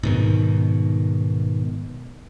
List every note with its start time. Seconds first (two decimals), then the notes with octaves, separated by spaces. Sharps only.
0.03 G#2 B2 D#3